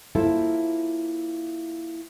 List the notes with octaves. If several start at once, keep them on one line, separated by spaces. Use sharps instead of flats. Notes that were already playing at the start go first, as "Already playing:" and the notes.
A#3 E4 F4 A4 C5 E5